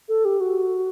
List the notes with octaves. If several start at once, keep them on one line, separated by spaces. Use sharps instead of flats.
A4
G4
F#4